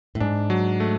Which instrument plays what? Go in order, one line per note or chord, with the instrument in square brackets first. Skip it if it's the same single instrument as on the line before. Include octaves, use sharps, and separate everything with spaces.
[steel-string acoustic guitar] A2
[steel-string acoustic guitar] G#2 [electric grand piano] D4
[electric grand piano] F#3
A3